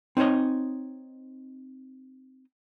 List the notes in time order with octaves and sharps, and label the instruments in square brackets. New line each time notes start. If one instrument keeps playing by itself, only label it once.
[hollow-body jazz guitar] C4 D#4 C5 C#5 D#5